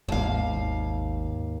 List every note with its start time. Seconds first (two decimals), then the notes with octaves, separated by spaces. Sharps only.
0.08 G#1 D#2 G#2 F5